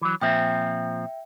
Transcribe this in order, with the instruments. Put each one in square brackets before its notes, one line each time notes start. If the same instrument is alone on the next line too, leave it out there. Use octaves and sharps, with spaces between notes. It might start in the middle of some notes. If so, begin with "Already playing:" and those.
[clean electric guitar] E3 F#3
[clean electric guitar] A#2 F3 C4 [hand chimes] E5 G5